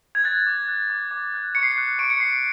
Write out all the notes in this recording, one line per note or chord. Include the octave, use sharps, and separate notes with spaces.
G#6
F#6 A6
D6
F#6
D6
D6
F#6
C#6 C#7
C7
C#7
F#6
C#6 D7
C#7
C#6 C7